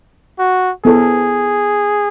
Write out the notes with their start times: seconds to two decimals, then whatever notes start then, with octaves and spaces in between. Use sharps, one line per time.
0.39 F#4
0.85 B3 E4 G#4 A4 C5